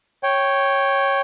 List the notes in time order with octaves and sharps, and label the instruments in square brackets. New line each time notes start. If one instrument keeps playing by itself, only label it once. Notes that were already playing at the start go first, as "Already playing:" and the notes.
[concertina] C#5 G5